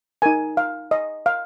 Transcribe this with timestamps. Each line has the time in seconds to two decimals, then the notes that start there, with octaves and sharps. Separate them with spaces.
0.22 D#4 A#4 G#5
0.57 F5
0.91 D#5
1.26 F5